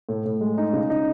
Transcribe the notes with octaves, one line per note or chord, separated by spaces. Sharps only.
A2
A2
G#3
D#4
C#3
D#4